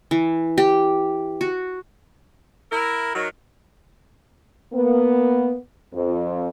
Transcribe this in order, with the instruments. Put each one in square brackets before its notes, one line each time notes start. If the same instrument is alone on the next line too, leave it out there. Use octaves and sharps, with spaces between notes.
[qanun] E3
G4
F#4
[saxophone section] E4 A#4
D#3 F#3
[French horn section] A#3 B3
F2